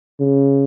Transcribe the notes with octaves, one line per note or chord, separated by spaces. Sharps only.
C#3